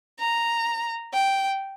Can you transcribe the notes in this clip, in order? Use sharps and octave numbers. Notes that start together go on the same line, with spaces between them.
A#5
G5